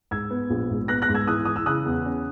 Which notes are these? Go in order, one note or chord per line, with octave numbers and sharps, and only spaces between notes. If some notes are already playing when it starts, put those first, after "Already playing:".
G#2 E6 G#6
B3
A#1
G#2
B3 F#6 A#6
F#6 A#6
G#2
E6 G#6
E3 D#6 F#6
E3 D#6
E6
C#3 D#6 F#6
E2
C#4